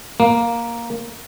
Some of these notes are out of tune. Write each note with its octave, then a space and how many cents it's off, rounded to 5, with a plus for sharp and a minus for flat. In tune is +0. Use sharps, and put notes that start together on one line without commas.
A#3 +5